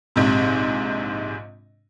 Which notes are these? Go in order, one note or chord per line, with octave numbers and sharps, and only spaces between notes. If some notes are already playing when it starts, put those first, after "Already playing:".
A#1 G#2 C3